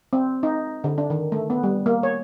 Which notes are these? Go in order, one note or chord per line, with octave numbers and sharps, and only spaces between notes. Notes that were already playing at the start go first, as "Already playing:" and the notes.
C4
D#4
D3
D4
D#3
A3
B3
G3
A#3
C#5